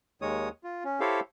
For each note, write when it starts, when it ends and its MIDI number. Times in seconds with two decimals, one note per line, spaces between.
0.21 0.49 39
0.21 0.49 51
0.21 0.49 56
0.21 0.49 73
0.21 0.49 87
0.64 0.84 65
0.85 1.00 61
1.00 1.20 64
1.00 1.20 67
1.00 1.20 69
1.00 1.20 72
1.00 1.20 73
1.00 1.20 77